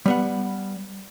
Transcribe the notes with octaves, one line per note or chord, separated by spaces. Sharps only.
G3 B3 F#5